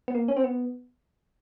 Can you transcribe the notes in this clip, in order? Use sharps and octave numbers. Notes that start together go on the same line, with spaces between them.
B3
A#3
C#4
C4
B3